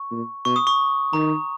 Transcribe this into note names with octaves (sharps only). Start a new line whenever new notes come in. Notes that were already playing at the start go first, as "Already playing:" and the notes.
Already playing: C#6
A#2
B2 C#6
D#6
C#6
D#3 A#5